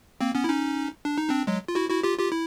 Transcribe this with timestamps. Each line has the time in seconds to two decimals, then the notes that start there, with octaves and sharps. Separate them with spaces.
0.21 A#3 C4
0.35 B3 C#4
0.44 E4
0.48 C#4 D#4
1.05 D4
1.18 D#4
1.29 C4 D4
1.47 F#3 G#3
1.68 F4
1.75 E4 F#4
1.90 E4 F#4
2.03 F4 G4
2.19 F4 G4
2.32 E4